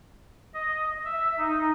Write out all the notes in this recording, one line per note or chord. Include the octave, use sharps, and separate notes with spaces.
D#5
E5
D#4